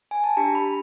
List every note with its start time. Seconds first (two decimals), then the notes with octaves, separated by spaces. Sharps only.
0.11 G#5
0.24 A5
0.37 D4 G4 A#5
0.55 B5